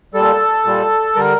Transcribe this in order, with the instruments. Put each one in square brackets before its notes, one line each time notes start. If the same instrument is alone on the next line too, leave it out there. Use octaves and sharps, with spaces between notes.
[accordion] A#2 G3 A4
A#2 G3
D3 G3 A#4